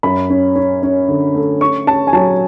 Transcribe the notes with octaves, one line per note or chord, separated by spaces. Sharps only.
F#2 B5
C#4
C#4
C#4
D3
A3
C#4 C#6
C#4 A5
G#5
F#3 A5